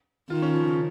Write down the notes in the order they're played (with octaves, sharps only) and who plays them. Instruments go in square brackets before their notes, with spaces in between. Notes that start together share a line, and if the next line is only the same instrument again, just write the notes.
[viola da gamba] D#3 [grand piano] F4
[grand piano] C#4
F3
C#3